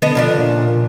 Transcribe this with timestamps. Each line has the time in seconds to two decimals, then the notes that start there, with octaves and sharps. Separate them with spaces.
0.02 D3 B3 A4 D#5
0.15 C#3 F3 D4
0.38 A#2